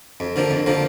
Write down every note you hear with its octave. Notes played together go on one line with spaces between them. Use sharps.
F2
D3 F3 A#3
F2
D3 F3 A#3